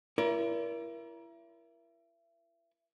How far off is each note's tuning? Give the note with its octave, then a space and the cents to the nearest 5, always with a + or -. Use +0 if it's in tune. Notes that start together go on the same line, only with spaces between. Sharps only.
E4 +30 A#4 +30 D5 -35